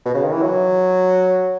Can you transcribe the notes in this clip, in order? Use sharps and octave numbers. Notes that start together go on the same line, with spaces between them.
B2
C#3
D#3
E3
F#3